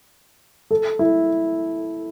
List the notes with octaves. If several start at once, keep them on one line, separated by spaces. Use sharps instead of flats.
A4
E4